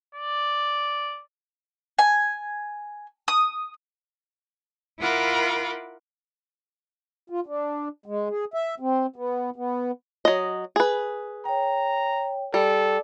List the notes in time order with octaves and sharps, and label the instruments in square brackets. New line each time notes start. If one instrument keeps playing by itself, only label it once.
[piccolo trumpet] D5
[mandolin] G#5
D#6
[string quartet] E4 F4 A#4 F#5 B5 D6
[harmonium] F4
D4
G#3
G#4
E5
C4
B3
B3
[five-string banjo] F#3 D#5
G#4 B4
[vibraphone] C#5 G5 [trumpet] A#5
[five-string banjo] G3 [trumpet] A4 [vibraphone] D5